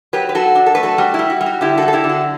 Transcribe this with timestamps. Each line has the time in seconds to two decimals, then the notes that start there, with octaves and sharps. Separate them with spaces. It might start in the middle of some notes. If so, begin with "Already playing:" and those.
0.13 F#3 G4 B4
0.29 B4
0.35 F#3 F#4 A4
0.55 D4
0.66 A4
0.75 A3 B4
0.83 F#4 A4
0.98 G3 F#4
1.14 G3 E4
1.30 F#4
1.41 G3
1.46 F#4
1.61 D3 E4 G4
1.77 F#4 A4
1.82 F#3
1.88 A4
1.93 E4 G4
2.04 D3
2.09 F#4